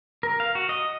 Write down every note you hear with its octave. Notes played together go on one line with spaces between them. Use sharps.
A#4
F5
F#4
D#5